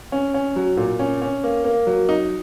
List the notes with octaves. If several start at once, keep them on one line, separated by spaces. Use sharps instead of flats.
C#4
C#4
F#3
A#2
C#4
C#4
A#3
A#3
F#3
D#4